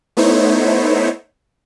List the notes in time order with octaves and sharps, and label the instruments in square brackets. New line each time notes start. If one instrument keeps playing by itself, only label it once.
[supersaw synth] A3 B3 D#4 E4 C5 C#5